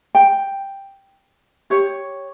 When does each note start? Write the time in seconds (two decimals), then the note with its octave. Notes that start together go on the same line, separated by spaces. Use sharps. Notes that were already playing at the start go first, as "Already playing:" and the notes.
0.15 G5
1.70 G4 C#5